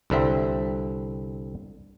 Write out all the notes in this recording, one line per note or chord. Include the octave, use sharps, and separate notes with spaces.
C2 D3 C4 E5